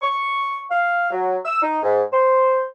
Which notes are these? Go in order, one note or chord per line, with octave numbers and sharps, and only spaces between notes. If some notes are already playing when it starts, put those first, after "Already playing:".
C#6
F5
F#3
E6
D#4
G#2
C5